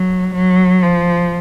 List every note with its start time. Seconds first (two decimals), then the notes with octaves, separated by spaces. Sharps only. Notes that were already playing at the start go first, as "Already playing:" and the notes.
Already playing: F#3
0.35 F#3
0.83 F3